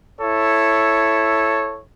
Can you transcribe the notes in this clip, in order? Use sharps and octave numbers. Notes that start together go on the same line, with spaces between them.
E4 A4 C#5